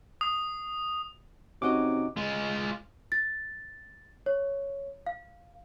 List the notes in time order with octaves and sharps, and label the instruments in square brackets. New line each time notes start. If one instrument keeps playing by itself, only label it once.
[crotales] D#6
[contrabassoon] C3 [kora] C#4 F#4 D#5 [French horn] D#4 [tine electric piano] D6
[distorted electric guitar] G#3 F4
[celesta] A6
C#5
F5